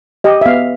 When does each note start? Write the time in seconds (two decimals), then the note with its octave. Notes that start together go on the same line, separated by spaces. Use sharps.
0.24 G4 D#5
0.41 E5
0.46 B3 F5